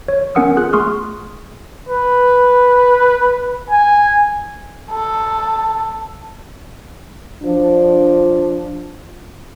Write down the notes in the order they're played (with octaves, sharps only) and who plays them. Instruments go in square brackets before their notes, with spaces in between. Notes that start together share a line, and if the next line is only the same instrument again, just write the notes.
[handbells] C#5
B3 C#4 A#4 F#5 D#6 E6
F4 G#4 F#6
A3 G#4 C6 C#6 D#6 F6
[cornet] B4
G#5
[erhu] A4
[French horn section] F3 D4